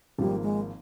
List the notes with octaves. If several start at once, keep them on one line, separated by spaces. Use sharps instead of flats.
G#1 G#2 F3 G3 A#3
G#3